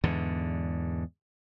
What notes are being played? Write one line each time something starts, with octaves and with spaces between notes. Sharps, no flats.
E2 G#2 D3